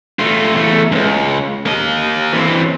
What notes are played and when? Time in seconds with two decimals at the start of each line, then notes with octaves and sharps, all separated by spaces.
0.19 A3 F4
0.54 E2 A3
0.92 C#2 G2
1.66 A#3 D#5
2.33 E3 C4